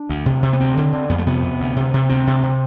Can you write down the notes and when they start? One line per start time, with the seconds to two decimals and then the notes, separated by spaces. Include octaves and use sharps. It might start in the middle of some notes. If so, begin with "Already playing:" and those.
Already playing: D4
0.09 D2
0.26 C3
0.43 C3
0.53 B3
0.60 D2 C4
0.77 D3
0.93 D3
1.09 F2 B3
1.18 A3
1.27 C3 B3
1.44 C3
1.60 D2
1.76 C3
1.94 C3
2.09 D2 C4
2.27 C3
2.43 C3